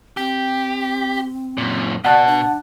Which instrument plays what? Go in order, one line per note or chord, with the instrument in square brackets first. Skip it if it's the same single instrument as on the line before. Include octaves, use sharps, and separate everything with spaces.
[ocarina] C4 [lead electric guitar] G4
[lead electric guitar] F#2 A#2
[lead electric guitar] B2 F#4 [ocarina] D5 [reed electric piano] F#5 A5 F#6
[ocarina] D4